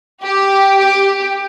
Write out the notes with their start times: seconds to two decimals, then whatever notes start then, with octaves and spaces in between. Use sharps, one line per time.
0.22 G4
0.78 G4